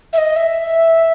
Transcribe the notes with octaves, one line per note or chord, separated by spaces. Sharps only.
E5
D#5
E5